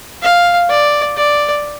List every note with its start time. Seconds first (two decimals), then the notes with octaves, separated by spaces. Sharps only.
0.23 F5
0.69 D5
1.17 D5